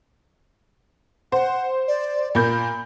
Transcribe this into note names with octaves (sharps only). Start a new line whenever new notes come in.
C5 F#5
D5
A#2 A#3 B5 G6